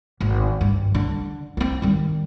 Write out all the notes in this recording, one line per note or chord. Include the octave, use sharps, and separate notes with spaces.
G#1
G2
D3
B3 C4
D#3 G3